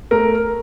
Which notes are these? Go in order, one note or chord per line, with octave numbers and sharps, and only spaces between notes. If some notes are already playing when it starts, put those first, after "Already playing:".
A3 A#4